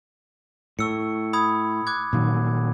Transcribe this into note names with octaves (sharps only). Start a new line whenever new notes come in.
A2 C#6 E6 C#7
B5 D#6 G#6
D6 F#6 G#6
A#2 D#3 F#3